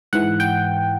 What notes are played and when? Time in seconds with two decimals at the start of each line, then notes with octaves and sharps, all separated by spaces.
0.13 G#2 E3 F#5
0.40 G5